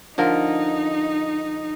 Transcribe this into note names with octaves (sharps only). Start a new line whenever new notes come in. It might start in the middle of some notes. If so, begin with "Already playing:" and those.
D3 F3 D#4 A#4